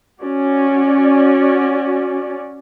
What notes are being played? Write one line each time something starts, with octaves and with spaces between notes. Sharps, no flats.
C#4 F#4 D5